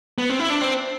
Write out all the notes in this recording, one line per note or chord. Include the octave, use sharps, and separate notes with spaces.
B3
C4
E4
D4
C4